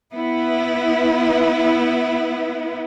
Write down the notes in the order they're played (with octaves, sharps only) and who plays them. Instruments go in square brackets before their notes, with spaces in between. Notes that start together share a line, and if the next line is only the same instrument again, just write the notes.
[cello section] B3 E4